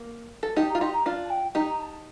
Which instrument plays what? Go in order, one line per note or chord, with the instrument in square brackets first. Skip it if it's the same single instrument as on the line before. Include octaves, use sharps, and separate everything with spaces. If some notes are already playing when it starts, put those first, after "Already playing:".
Already playing: [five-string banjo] A#3
A4
[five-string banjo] D#4 G4 [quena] A5
[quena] A#5
[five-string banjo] F4
[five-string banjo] D#4 G4 [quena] C6
[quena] A#5
[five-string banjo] D4 F4
[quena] A5
G5
[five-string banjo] D#4 G4 [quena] A#5
[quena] A#5
A5